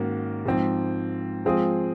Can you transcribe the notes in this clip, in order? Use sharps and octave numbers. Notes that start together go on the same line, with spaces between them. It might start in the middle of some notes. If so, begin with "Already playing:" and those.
Already playing: G#2 D#3 A#3 C#4 F#4
G#2 F3 C4
F3 G#3 C4 F4 G#4